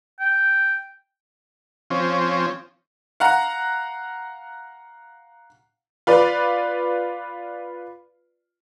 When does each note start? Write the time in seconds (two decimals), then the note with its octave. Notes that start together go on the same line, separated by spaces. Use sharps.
0.20 G5
1.90 F3 C4 C#4
3.20 F5 F#5 A#5
6.07 F4 B4 D5